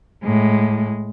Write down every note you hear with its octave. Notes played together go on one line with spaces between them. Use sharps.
A2 G#3